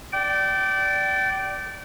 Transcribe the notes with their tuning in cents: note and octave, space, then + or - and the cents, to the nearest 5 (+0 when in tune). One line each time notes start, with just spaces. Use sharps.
D5 +0 G5 -30